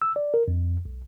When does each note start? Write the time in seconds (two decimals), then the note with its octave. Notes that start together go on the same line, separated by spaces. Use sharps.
0.02 E6
0.16 D5
0.34 A#4
0.48 F2
0.85 B1